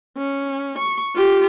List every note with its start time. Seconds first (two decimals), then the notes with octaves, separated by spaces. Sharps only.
0.17 C#4
0.79 C#6
1.15 F4 G4